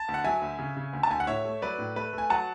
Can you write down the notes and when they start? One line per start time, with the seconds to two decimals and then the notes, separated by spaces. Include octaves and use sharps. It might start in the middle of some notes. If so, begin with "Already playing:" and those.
Already playing: A5
0.08 D2
0.14 F#5
0.24 F#3 E5 G#5
0.42 D2
0.59 C#3
0.77 C#3
0.93 D2
1.03 A5
1.11 D2 G#5
1.20 F#5
1.27 A2 C#5 E5
1.45 A3
1.62 F#3 B4 D5
1.79 A2
1.96 A3 B4
2.13 A3
2.18 G#5
2.30 F#3 F#5 A5